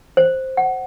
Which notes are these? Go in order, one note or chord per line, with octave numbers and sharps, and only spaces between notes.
C5
F#5